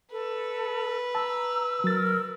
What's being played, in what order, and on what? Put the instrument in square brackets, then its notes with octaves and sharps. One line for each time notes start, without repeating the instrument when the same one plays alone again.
[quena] A4 [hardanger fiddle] B4
[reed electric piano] A5 [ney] A#5 [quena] E6
[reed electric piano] F#3 A6 [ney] A#4